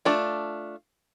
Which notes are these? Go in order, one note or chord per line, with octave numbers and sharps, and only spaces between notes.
A3 D4 F4